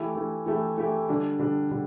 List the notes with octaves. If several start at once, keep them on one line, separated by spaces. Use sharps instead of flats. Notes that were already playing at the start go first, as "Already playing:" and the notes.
Already playing: E3 A3 E4 G4
E3 A3 E4 G4
E3 A3 E4 G4
E3 A3 E4 G4
D3 G3 D4
D3 G3 D4
D3 G3